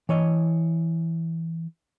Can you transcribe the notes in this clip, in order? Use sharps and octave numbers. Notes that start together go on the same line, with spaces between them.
E3 C#5 D#5